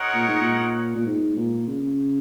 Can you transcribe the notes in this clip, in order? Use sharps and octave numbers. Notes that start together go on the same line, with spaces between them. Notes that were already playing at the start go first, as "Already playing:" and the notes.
Already playing: G#3 D#4 A#4 C#5 F#5
A#2
G#2
A#2
A#2
G#2
A#2
C#3